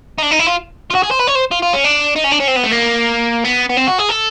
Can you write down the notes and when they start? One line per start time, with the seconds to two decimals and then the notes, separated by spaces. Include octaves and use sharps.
0.18 D#4
0.22 D4
0.31 D#4
0.39 E4
0.47 F4
0.91 F4
0.95 F#4
1.03 G#4
1.11 C5
1.19 B4
1.27 C#5
1.35 C5
1.51 F4
1.62 F4
1.73 C#4
1.84 D4
2.16 D#4
2.24 C#4
2.32 D4
2.40 C#4
2.48 C4
2.56 B3
2.64 A3
2.72 A#3
3.45 B3
3.69 B3
3.77 C4
3.87 F#4
3.98 G#4
4.09 A4